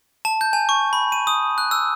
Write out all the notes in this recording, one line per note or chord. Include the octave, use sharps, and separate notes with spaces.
A5
G6
G#5
C#6
B5
D#7
D#6
F#6
E6